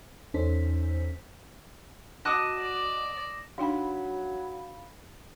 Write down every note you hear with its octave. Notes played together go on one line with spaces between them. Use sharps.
E2 C#4 D#4 A4 C5 B6
F#4 D#5 A5 D6 D#6 F#6 A#6 E7
D5
F#3 D4 D#4 F5 G5 B5